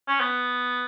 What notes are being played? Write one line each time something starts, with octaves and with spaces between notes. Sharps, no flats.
C#4
B3